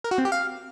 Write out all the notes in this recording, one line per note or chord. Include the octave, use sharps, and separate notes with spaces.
A#4
F#4
C4
G4
F5